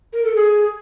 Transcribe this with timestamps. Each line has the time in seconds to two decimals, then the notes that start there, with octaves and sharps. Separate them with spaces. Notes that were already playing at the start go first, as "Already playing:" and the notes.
0.13 A#4
0.24 A4
0.35 G#4